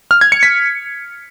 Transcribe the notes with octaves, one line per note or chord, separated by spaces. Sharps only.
F6
G#6
C#7
B6